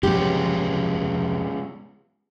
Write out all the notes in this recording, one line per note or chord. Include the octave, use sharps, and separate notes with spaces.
C3 F3 F#3 G#3 B3 C#4 G4